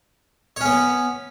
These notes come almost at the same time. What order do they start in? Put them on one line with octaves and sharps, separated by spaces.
C#5 C#4 B3